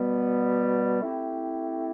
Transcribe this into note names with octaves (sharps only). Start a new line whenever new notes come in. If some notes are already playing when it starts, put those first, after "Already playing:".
Already playing: B2 G3 B3
A3 C4 E4 G4